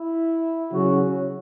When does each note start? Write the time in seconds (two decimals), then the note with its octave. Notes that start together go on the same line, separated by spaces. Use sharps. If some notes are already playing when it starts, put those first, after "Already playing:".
Already playing: E4
0.72 C#3 F#3 C#4 F#4